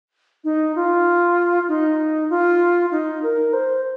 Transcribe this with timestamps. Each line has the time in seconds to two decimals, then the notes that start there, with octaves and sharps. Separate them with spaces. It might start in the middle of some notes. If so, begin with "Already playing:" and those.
0.44 D#4
0.76 F4
1.68 D#4
2.30 F4
2.91 D#4
3.23 A#4
3.53 C5